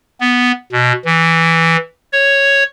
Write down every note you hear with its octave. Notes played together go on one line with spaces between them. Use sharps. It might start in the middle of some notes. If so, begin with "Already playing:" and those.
B3
B2
E3
C#5